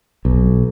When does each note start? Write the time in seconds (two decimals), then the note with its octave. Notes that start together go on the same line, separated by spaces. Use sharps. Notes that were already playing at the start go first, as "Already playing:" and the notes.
0.25 B1